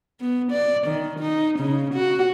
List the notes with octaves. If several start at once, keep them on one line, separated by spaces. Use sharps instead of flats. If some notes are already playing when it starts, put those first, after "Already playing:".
B3
D5
D#3
D#4
C#3
F#4